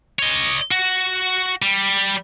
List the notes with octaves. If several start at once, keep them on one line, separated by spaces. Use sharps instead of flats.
C#5 D#5
F#4
G3